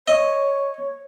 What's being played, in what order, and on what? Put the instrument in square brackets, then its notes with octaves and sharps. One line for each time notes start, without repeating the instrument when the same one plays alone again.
[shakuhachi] C#5 [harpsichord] D#5